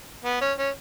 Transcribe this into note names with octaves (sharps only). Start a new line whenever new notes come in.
B3
C#4
C#4